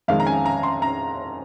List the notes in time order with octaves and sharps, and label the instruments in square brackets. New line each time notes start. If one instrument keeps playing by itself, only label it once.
[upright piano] F2 D#3 G#3 F5
A#5
G#5
A#5
C6
A#5